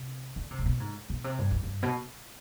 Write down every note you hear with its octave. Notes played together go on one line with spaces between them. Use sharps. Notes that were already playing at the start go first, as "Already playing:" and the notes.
Already playing: C3
D3
C3
G#2
B2
G#2
B2
C3
G2
F2
G2
B2